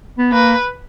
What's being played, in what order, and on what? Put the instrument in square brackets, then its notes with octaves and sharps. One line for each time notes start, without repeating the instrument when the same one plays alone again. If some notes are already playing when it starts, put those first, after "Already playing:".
[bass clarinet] B3
[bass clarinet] A#3 [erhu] B4